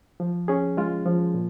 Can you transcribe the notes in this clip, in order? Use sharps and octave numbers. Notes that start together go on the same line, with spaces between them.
F3
C#4 G#4
G#3 F4
F3
A#2